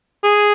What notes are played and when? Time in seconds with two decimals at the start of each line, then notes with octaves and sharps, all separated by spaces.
0.24 G#4